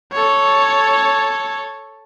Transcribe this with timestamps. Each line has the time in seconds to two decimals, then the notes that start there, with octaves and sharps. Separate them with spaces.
0.12 A4 C#5